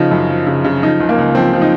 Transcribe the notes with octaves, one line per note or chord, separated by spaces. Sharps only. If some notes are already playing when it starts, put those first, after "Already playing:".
Already playing: C#3 F3 D#4
F#2
F3
C#3
C#3
F3 D#4
C#2
A#3
C#2
F3 C4
F3
D#4